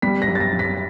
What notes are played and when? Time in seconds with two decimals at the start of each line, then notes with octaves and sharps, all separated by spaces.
0.02 G3 B6
0.22 A#6
0.28 F#2
0.35 A6
0.40 A#6
0.53 F#2
0.59 B6